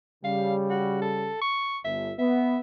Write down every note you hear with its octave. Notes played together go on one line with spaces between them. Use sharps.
C#3 G3 F5
F#4
A4
C#6
G1 E5
B3 E5